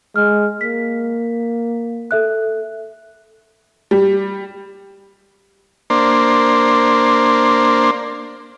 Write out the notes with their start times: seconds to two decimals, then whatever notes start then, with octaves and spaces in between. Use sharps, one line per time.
0.16 G#3 F6
0.61 A#3 B6
2.11 A4 E5 F#6
3.91 G3
5.90 A#3 D4 C5